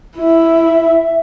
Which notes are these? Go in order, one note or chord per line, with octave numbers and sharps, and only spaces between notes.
E4 E5